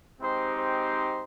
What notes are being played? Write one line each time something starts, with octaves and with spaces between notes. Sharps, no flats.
G#3 C4 D#4 G4 C5
C5